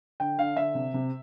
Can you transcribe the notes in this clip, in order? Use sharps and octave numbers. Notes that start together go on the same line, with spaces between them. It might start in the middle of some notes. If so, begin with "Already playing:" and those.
D3 G5
D3 F5
D3 E5
C3
C3